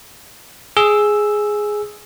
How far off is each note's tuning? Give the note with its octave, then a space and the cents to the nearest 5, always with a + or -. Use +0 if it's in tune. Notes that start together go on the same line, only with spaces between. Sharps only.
G#4 +5 E6 +0